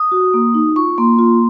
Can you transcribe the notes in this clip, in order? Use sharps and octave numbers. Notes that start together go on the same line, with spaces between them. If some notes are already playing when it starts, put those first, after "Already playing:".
Already playing: D#6
F#4
A#3
D#4
F4 C#6
A#3 C6
F4